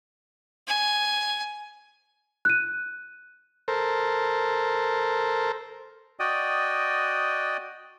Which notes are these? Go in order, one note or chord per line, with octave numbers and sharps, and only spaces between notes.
G#5
F#6 D#7
A4 A#4 C5
F#4 D5 D#5 G5 D#6